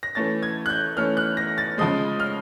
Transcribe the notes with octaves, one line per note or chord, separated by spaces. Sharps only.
A#6
E3 A3 C#4 A6
G#6
F#6
G6
E3 A3 C#4 F6
F#6
A#6
A6
C#3 F3 G#3 D#6
F6